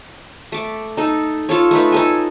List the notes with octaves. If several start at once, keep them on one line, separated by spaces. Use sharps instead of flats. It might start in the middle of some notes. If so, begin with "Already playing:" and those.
A3 D6
D#4 A4
F4 A4 C#5
A3 D#4 B4
D#4 A4 G#5